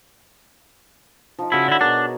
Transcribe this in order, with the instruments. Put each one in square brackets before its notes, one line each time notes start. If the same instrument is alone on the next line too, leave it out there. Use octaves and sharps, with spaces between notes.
[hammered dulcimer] F3 D#4
[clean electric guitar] C#3 E4 [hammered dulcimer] F#4 C#5
[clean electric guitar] D3 E4
[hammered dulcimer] B2 G#4 A#4 [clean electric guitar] D4